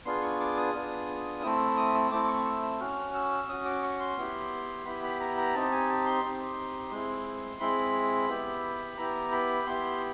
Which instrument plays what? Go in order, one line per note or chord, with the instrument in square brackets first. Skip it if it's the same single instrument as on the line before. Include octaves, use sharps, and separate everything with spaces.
[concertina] B3 D4 F4 G#4 C6
C#6
D6
D#6
B3 D4 F4 G#4
A3 C4 E4 E6
E6
D#6
E6
A3 C4 E4 D6
D6
C#6
E6
E6
C#4 F#4 F6
E6
C#4 F#4 D#6
D6
C#6
C6
B3 E4 G4
B3 E4 G4 B5
B5
A#5
A#5
C4 D#4 G4 A5
G#5
A5
C6
C4 D#4 G4
G#3 C4 E4
G#3 C4 E4 B5
B3 E4 G4
B3 E4 G4 A#5
B5
B3 E4 G4 C6